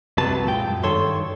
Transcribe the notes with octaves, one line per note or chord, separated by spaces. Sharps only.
C2 F#2 C3 F#3 B4 A5
A#2 G#3 G5
F#2
G2 D#3 A4 C#5 C6